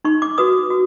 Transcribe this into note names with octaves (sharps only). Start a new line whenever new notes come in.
D#4 C#6
D6
F#4 B4 D#6
F#4